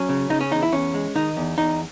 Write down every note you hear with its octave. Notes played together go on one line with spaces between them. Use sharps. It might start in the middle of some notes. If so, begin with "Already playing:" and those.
Already playing: F#3 C#4
C#3
C#3 D#4
C#4
E2 D#4
E4
E2 C#4
G#3
D#3 D#4
E2
E2 D#4